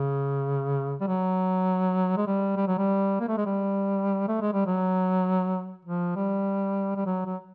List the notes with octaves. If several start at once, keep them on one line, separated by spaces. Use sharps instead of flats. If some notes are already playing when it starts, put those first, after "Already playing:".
Already playing: C#3
G3
F#3
G#3
G3
G3
F#3
G3
A#3
A3
G#3
G3
A3
G#3
G3
F#3
F3
G3
G3
F#3
F#3